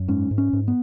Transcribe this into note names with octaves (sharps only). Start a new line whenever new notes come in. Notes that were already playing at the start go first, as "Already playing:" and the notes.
Already playing: F#2
G#2 C#4
G#2
C#4
G#2
B3